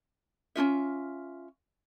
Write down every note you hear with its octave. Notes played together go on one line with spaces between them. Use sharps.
C#4 D4 F4 E5